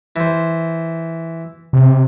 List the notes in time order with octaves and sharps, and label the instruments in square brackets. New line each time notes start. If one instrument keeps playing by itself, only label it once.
[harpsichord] E3 C5
[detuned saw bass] C3